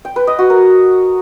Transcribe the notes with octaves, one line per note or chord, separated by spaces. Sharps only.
G5
B4
D#5
F#4
A#4